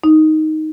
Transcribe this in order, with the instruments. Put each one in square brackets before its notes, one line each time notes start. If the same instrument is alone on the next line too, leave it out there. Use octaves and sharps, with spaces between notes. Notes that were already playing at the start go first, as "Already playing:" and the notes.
[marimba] D#4